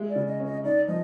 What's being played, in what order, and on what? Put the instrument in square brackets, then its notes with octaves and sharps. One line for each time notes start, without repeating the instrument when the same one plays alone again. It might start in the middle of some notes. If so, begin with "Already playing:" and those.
Already playing: [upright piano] G#3 E4
[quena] D5
[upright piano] C#3
[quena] D#5
[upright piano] C#4
[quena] D#5
[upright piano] D#4 [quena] D5
[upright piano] F3 [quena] D#5